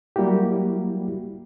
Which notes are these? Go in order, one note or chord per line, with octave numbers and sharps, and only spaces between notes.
F#3 G3 A#3 E4 F#4 G4